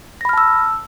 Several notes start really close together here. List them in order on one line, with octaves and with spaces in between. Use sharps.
A#6 B5 F6 A5 E6